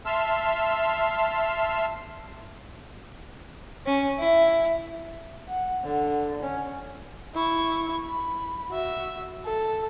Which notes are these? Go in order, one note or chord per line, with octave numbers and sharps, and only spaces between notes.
E5 A5 C6 E6 F6
C#4
E4
F#5
D3
C#4
E4 C#6
B5
F#4 E5
A4